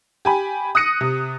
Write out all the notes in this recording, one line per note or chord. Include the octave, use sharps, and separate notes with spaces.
G4 G#5 B5
D#6 F#6 A#6 C#7 D#7
C3